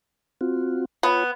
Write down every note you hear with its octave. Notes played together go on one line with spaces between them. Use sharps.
C4 F4 F#4
B3 F4 C#5 G#5